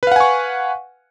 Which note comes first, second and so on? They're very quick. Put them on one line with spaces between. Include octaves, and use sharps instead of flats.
B4 F5 F#5 G#5 C#6